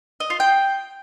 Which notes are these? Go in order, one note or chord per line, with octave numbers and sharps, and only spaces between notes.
D#5
F4
G5